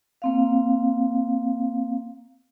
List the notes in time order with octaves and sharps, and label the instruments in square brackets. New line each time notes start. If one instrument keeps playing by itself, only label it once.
[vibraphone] A#3 C4 F5